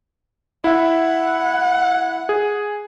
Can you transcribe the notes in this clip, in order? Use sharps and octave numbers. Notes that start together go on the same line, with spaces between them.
E4 E5 F#5
G#4